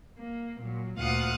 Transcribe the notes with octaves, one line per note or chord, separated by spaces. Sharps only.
A#3
A#2 F#3
D2 A#2 F4 F5 F#5 D#6